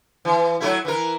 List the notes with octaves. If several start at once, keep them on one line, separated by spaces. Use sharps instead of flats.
E3
F#3 A3 E4
E3 A#4